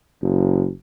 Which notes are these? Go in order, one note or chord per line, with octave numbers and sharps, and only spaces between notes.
F#1